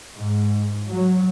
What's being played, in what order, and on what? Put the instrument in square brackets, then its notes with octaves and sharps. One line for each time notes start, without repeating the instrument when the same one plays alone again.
[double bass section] G#2
F#3